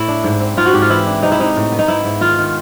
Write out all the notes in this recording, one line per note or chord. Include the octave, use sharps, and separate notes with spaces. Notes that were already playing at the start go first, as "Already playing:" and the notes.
Already playing: A2 E4
D4
G#2
C4
G#2 F4
F#4
G#2 G4
F4
E3 E4
D4
C3 D#4
E4
C3 D#4
A2
B3
D#4
G#2 E4
G#2
D#3 F4
D#3